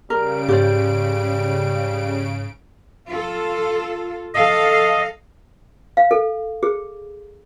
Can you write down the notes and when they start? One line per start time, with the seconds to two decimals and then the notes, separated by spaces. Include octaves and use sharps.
0.10 C#3 G3 A#4 D7
0.49 G#2 G4 C5 D5
3.09 F4 A4
4.34 A4 D#5 F5
5.97 F5
6.11 A4
6.63 G#4